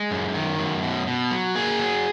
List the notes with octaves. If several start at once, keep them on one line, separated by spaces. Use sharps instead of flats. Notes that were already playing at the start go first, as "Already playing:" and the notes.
Already playing: G#3
F#2
D#3
F#2
B2
B2
F#3
A#3 G#4
F#3